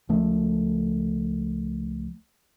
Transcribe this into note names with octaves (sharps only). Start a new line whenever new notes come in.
C#2 F3 A3